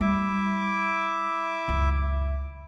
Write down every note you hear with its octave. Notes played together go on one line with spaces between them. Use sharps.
G3 E4 E5 D6
C#2 F#2